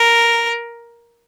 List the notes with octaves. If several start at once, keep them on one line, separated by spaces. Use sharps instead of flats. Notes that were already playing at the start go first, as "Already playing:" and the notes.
Already playing: A#4